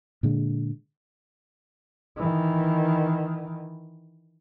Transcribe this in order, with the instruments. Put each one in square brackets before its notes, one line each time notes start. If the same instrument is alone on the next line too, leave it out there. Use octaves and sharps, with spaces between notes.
[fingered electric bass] A#2 D3 G#3
[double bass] D#3 E3